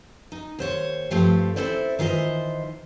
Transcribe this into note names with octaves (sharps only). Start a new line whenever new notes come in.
D#4
D#2 C5 C#5
G2 F3 A3 C4 G4
C4 E4 F4 A4 C5 D5
D#3 E3 F4 C5 D#5